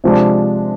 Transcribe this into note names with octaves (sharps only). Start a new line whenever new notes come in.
C3 F3 G#3 D4